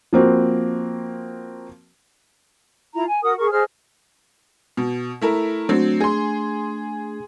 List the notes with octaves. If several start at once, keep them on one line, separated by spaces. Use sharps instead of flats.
F3 A#3 C4 F#4
E4 F4 A#5
G#5
F#4 A#4 F#5 D#6
G#4 A#4 C#6
G#4 C5 D#5 F6
B2
A3 E4 A#4
F#3 A3 C4 D4
G#4 C6